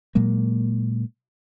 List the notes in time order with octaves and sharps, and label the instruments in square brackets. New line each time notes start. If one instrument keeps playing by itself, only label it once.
[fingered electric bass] A#2 F#3 G#3 A#3